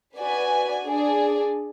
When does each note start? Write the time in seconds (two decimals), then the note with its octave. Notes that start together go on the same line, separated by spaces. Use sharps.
0.18 F#4 B4 D5 G#5
0.84 D4 G#4 D5